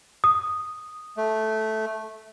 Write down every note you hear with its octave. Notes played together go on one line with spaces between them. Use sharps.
D#6
A3